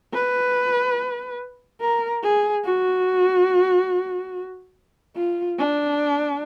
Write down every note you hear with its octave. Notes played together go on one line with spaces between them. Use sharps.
B4
A#4
G#4
F#4
F4
D4